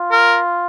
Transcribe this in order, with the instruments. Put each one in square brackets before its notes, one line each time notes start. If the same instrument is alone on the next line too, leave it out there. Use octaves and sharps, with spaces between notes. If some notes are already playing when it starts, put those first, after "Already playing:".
Already playing: [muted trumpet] F4
[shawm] A#4